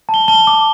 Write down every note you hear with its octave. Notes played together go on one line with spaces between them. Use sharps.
A5
G7
A5 G7
D6